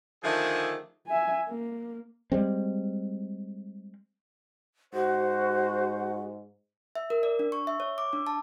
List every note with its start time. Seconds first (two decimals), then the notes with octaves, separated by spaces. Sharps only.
0.23 D3 D#3 F3 A3 D4 G#4
1.07 E5 G#5
1.49 A#3
2.32 G3 G#3 C4
4.94 G#2 F#4 C5 F#5
6.95 E5
7.10 A#4
7.23 D5
7.39 D4
7.52 C#6
7.67 E5
7.80 C#5
7.98 D6
8.13 D4
8.27 A5